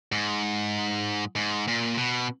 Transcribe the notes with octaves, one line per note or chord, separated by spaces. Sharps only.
G#2
G#2
A#2
B2